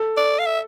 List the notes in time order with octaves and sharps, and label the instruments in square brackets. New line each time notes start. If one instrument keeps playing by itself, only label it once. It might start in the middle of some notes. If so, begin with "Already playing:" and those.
Already playing: [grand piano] A4
[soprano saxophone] D5
F5
E5